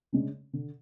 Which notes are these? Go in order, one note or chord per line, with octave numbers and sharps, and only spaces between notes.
C#3 G#3 D4
D3